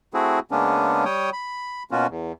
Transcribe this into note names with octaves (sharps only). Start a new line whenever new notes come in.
A3 C4 E4 F#4 G#4
C#3 G#3 A#3 B3 C#4 D4
G3 C#5 G5 D#6
B5
B2 A#3 C#4 F4 F#4
E2